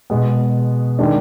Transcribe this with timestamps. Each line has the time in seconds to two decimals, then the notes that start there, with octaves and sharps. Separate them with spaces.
0.10 B2 G#3 B3
0.99 D#3 G#3 D4